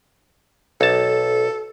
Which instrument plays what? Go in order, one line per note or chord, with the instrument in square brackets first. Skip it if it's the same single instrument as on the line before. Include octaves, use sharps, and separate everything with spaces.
[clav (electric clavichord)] B1 A5 [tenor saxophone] A4